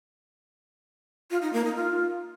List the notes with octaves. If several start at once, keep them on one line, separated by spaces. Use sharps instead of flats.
F4
D#4
A#3
D#4
F4